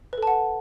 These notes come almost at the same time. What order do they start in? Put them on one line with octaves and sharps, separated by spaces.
B4 A4 A5 F#5